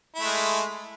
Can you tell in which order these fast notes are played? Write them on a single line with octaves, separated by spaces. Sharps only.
E4 A3 G#3